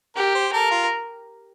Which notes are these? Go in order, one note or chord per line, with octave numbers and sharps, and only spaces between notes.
G4 A#4
C5
A4 A#4
F4